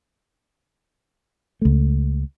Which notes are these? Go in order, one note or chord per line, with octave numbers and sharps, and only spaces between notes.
C#2 A3